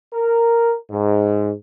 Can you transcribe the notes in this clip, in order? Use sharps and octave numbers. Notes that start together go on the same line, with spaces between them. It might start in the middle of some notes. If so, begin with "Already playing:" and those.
A#4
G#2